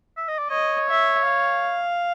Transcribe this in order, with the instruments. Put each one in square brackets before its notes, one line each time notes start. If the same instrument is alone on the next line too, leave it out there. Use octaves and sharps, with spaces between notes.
[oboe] E5
D#5
D5
[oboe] C#5 [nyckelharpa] D#5
[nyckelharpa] E5
F5